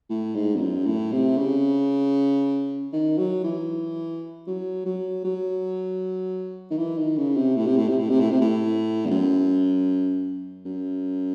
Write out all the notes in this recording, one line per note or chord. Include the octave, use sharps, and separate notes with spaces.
A2
G#2
E2
F#2
A2
C3
C#3
D#3
F#3
E3
F#3
F#3
F#3
D#3
E3
D#3
C#3
C3
A2
C3
A2
C3
A2
C3
A2
C3
A2
E2
F#2
F#2